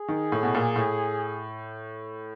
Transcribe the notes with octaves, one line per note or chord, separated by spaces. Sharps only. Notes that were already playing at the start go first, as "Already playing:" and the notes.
Already playing: G#4
D#3
A2
B2
A#2
A2